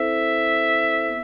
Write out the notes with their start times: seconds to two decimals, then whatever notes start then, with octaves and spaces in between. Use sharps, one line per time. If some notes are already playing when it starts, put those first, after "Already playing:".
Already playing: C4 E4 A4 C5 E5
1.07 B3